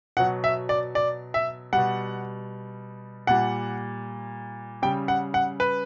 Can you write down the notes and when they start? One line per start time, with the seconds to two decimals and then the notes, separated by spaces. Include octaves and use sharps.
0.17 B2 F#3 F#5
0.44 E5
0.69 D5
0.95 D5
1.34 E5
1.73 B2 G3 F#5
3.27 A#2 G3 F#5
4.82 C#3 G3 G5
5.08 F#5
5.34 F#5
5.60 B4